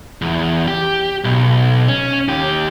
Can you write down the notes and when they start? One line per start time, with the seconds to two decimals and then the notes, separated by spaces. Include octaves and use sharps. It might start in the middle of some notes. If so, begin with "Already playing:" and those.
0.22 E2
0.68 G4
1.24 B1
1.88 C#4
2.28 D#2 G4